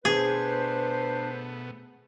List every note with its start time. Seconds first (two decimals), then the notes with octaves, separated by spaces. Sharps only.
0.05 B2 A3 B3 D4 G#4 B4 C5